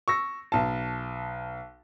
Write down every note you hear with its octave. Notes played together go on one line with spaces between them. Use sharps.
C#6 E6 A#6
B1 A5